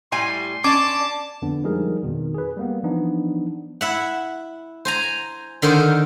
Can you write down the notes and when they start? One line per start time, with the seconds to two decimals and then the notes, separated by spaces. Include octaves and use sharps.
0.12 A2 G3 G#5 C6
0.64 C#4 D5 A5 D6
1.42 F2 D3 B3 D4
1.64 F3 G3 G#3 D#4 G#4 A#4
2.03 F2 B2 D#3
2.34 G#4 B4
2.57 G3 A#3 B3
2.83 E3 F3 B3 D4 D#4
3.81 E4 E5 F#5
4.85 C5 G#5 A#5
5.62 D3 D#3 A#4 C5